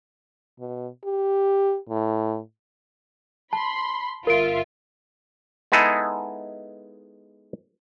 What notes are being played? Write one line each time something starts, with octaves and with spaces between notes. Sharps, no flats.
B2
G4
A2
A5 B5 C6
G1 F4 A#4 E5 D7
G#3 B3 D#4 E4 G#4 A4